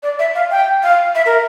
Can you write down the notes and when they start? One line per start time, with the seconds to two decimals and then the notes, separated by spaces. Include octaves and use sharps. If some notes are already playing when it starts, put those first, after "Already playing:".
0.03 D5
0.19 E5
0.35 F5
0.51 G5
0.83 F5
1.15 E5
1.26 A#4